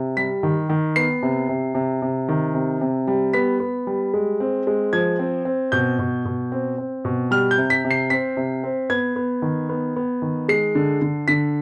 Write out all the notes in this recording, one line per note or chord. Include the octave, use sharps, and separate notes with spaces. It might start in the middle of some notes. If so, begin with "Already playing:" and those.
Already playing: C3
G3 B6
D#3
D#3
B3 C7
C3
C3
C3
C3
D#3
C3
C3
G3
B3 B6
B3
G3
G#3
C4
G#3
F3 G#6
C4
C4
B2 G6
B2
B2
C4
C4
B2
G3 F6
G6
C3
B6
C3
C7
C4 B6
C3
C4
B3 G#6
B3
D#3
B3
B3
D#3
G#3 C7
D3
D3
D3 B6